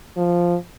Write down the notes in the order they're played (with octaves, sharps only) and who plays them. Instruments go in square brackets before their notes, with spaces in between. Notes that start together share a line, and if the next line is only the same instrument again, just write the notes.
[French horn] F3